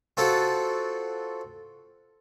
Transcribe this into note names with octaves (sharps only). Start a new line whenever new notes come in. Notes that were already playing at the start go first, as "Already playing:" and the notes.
C4 F4 F#4 A4